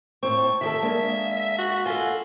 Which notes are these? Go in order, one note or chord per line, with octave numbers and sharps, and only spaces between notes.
A2 C4 C#6
D#3 G#4 A4 E5
G#3 A#3 D4
F#4
F4 A4 F#5 G#5